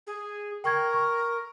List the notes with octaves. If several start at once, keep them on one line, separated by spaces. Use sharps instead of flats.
G#4
A#4 G5 C#6 G#6
C#6